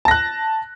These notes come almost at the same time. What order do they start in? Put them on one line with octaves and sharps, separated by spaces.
A5 A#6 F#6